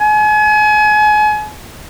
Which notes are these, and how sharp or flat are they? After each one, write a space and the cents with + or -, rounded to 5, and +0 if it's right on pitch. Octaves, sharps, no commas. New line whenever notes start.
G#5 +35